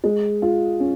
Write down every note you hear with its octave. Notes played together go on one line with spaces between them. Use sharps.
G#3
F4
C#4